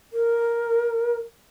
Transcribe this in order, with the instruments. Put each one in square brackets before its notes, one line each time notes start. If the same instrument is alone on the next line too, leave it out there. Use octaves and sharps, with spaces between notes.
[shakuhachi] A#4